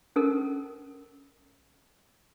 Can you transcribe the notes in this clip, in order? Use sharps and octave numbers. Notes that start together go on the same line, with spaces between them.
C#4 A4 A#4